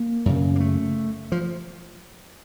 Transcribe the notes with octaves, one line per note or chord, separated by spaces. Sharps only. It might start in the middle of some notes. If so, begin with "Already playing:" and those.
Already playing: A#3
F#2 C#3
A#3
A3
F3